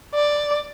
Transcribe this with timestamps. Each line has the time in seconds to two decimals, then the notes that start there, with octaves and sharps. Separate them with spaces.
0.14 D5